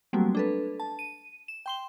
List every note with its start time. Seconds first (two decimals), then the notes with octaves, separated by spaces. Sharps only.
0.13 F#3 G3 A3 A#3 C4 F#4
0.35 D4 A4 B4
0.80 A5
0.99 D#7
1.48 E7
1.66 G5 C6 G7